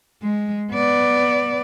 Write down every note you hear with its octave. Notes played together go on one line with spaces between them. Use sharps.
G#3
B3 D5